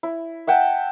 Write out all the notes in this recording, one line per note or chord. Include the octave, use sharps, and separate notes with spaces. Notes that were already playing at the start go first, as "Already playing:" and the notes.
E4
E5 F#5 G5 A5